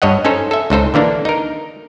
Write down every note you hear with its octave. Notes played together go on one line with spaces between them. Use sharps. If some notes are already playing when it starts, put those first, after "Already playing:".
G2 C#5 D#5 F#5
C#4 D#4 A4 C5
A4 E5
C#2 D#4 A4 C5
D3 E3 A#3 D4
D#4 A#4